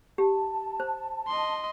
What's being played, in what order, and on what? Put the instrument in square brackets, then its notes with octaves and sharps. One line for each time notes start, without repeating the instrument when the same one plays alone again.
[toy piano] G4 [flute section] A5
[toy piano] C5
[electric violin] D#5 C6